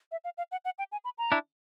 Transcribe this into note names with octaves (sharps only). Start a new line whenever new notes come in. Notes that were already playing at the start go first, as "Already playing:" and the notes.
E5
F5
F5
F#5
F#5
G5
G#5
B5
A#5
D4 E4